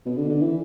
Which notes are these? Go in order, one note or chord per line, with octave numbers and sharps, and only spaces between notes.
B2
D3
D3
E3